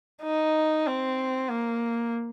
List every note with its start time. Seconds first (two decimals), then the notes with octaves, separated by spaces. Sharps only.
0.23 D#4
0.87 C4
1.51 A#3